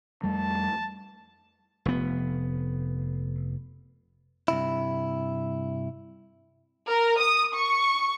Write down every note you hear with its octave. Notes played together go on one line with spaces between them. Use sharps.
F2 G3 A3 A5
F1 B3
G2 C3 E4
A#4
D#6
C#6